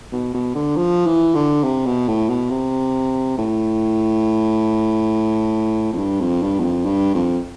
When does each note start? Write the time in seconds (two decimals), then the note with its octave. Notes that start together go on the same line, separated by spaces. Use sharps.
0.12 B2
0.34 B2
0.54 D3
0.76 F3
1.06 E3
1.35 D3
1.63 C3
1.86 B2
2.08 A2
2.29 B2
2.50 C3
3.37 A2
5.93 F2
5.98 G2
6.20 F2
6.42 G2
6.59 E2
6.63 F2
6.85 G2
7.14 F2